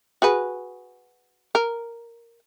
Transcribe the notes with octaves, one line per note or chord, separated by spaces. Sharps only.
F#4 G#4 B4
A#4